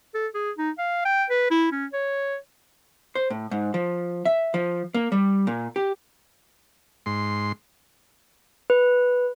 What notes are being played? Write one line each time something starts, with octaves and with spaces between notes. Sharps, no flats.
A4
G#4
D#4
F5
G5
B4
E4
C#4
C#5
C5
A2
G#2
F3
E5
F3
A#3
G3
A#2
G4
G#2 C6
B4